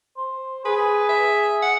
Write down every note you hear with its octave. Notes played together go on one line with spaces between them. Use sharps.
C5
G#4 B4
E5
F#5